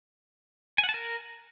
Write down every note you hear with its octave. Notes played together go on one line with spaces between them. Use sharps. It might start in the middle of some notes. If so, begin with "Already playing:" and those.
G#5
F#5
A5
A#4